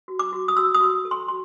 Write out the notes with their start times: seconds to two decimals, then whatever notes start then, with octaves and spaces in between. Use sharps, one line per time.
0.08 F#4
0.19 D6
0.32 F#4
0.48 D#6
0.56 F#4 E6
0.74 D#6
0.80 F#4
1.05 A4
1.11 C6
1.28 F#4 C6